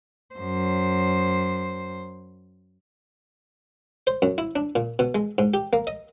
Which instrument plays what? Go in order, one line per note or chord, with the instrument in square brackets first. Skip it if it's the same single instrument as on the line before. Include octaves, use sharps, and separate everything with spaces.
[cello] F#2 C5
[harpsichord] C5
F#2
E4
D4
A#2
B2
G#3
G#2
G4
A#3
D#5